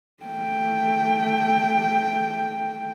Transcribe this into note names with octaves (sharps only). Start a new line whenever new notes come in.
A3 G5